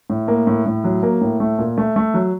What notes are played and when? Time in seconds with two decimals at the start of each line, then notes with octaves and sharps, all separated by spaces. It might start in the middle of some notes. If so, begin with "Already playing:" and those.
0.10 A2
0.28 A#3
0.47 A2
0.66 A2
0.84 F#3
1.03 A#3
1.21 A2
1.40 A3
1.59 A#2
1.78 A3
1.96 A3
2.14 F#3